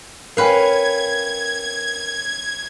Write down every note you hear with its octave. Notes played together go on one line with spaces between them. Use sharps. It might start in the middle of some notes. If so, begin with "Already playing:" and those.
C#4 A#4 B4 F5 G5 G#6